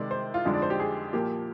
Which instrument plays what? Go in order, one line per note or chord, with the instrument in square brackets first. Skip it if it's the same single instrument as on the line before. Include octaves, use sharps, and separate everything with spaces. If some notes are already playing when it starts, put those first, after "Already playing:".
Already playing: [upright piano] C3 D#3 G#3 D5
C5
F4
F2 D3 G#3 D#4
D5
C5
G4
G#4
A#2 F3 A#3 G4